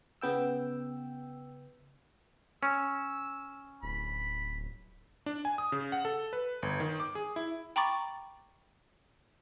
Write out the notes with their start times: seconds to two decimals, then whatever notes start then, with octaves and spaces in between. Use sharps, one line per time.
0.21 C#3 B3 G5 E6
2.63 C#4 E6
3.83 D1 B5
5.26 D4
5.45 G#5
5.58 D#6
5.72 C#3
5.92 F#5
6.05 A4
6.33 B4
6.62 G1
6.80 D#3
7.00 D6
7.15 G#4
7.36 E4
7.76 G5 A#5 B5 C#6 D6 A6